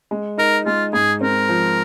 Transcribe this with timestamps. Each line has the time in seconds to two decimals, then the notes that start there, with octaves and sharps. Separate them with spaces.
0.11 G#3
0.38 D#4 A#4
0.65 G#3 F4
0.93 G#2 G#4
1.21 C4 A#4
1.49 F3